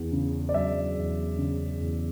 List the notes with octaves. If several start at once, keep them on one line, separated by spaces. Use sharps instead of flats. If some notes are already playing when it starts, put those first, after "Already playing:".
Already playing: E2
C#3
D5
F#3 E5
E2
C#3
E2